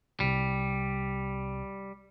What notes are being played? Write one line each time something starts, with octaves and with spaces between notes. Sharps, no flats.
C2 C3 G3